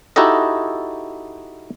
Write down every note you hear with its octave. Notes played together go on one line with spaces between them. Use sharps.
D#4 E4 F#4 G4 A4 D#5